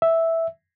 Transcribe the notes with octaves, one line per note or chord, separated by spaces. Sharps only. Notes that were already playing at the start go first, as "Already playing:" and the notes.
E5